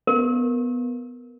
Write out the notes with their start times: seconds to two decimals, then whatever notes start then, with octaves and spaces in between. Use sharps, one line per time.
0.07 B3 A#4